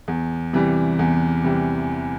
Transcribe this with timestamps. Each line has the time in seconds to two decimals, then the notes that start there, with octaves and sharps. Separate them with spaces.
0.08 E2
0.53 C3 E3 G3
0.99 E2
1.44 C3 E3 G3